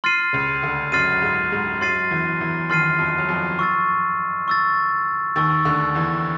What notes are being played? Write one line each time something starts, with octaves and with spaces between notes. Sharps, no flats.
C6 F6 A6 C7 D#7
C#2 C#3
D2 D3
F#2 F#3 C6 F6 A6 C7 D#7
G#2 G#3
G#2 G#3
F#2 F#3 C6 F6 A6 C7 D#7
E2 E3
E2 E3
D#2 D#3 C6 F6 A6 C7 D#7
F2 F3
F#3
F2 F3
C#6 E6 A6
C#6 E6 A6
D#2 D#3 C#6 E6 A6
D2 D3
E2 E3